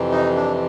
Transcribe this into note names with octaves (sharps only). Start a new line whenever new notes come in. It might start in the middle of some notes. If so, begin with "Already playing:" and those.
Already playing: F2 C3 E3
D#4
D4